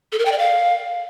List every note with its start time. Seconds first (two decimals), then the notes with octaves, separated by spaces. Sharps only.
0.12 A4
0.19 A#4
0.25 G5
0.32 D5
0.38 F5